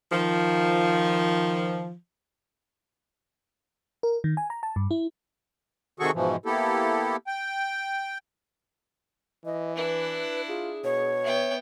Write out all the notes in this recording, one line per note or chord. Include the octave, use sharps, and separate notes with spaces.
D#3 F3
A#4
D#3
G#5
A#5
A5
G2
E4
C3 D#3 F#4 G#4 A4 C#6
G#2 B2 E3 F3
A#3 B3 E4 G4 A4
G5
E3 D#5
D4 E4 B4
F4 G#4
B2 C#5
B3 E5 G5